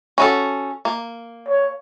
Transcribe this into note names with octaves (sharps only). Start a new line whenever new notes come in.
C#4 F#4 A4
A#3
C#5